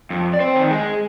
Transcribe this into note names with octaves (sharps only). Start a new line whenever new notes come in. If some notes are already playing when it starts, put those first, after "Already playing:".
F2
D5
C4 C5
D#3
G#3 G#4